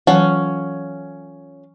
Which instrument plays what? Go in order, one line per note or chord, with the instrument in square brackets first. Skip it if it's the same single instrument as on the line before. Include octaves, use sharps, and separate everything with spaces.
[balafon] E3 F#3 [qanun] C#4 [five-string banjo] F4 A4 F#5